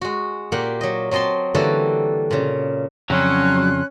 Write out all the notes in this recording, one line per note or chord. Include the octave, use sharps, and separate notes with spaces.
G#3 F#4
A#2 A#3 G4 F#5
F#3 D#5
F#3 C4 D#5 A5 C6
D3 E3 G3 A#3 F#4 A4
A#2 C#3
F2 C#3 F#3 C#4 D4 C6 F#6